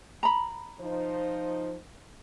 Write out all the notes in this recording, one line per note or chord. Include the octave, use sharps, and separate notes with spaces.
A#5 B5
F3 D#4 C5